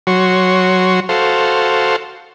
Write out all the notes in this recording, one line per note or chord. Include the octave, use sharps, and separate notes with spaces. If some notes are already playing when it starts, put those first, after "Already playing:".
F#3 F#4 C#5 C6
F#4 A4 C5 F5